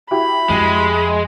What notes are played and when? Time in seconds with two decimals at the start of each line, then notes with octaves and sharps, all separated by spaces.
0.11 E4 F#4 G4 B5
0.50 F2 G#3